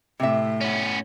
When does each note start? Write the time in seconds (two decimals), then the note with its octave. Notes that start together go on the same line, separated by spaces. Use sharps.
0.20 A2 C3 E5
0.61 B3 C#4